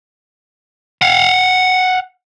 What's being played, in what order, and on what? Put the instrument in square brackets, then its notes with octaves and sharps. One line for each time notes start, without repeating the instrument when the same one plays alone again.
[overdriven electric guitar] F5 F#5